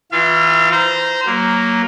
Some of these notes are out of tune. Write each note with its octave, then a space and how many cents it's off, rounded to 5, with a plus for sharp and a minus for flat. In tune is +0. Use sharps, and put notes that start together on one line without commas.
E3 -15 F4 +0 F5 -40
C5 -20 A#5 +0
F#3 +10 A#3 +0